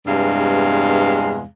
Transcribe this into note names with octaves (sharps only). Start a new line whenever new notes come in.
E2 G2 C3 G#3 F5